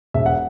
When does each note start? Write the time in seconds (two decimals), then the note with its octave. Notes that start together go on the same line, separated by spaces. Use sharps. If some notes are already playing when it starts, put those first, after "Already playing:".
0.14 E1 E5
0.26 F#5